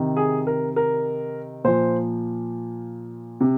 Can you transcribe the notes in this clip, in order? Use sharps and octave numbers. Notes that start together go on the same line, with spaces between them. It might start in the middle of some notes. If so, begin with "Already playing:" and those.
Already playing: C3 D#3
G#4
A#4
A#4
A#2 F3 C5
C3